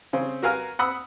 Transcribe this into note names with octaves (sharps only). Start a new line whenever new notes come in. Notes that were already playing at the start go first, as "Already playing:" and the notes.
C#3 C4
F#4 A#4 B4 F5 G#5 F6
F#5 B5 D#6 E6